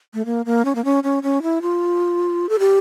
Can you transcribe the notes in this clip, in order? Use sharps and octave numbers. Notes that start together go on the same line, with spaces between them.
A3
A#3
A#3
C#4
A#3
C#4
C#4
C#4
E4
F4
A4
G4